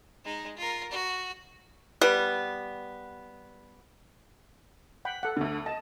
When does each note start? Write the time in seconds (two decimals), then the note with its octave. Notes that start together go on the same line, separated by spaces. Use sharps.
0.24 G#3 D#4
0.57 F4 A#4
0.91 F#4
2.01 G3 B3
5.05 F#5 G5 B5
5.23 A4 F#5
5.37 D2 D3
5.66 D#5 A5